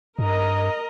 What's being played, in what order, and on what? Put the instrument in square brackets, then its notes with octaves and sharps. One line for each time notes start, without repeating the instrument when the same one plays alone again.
[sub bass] G2 [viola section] A#4 D#5 A#5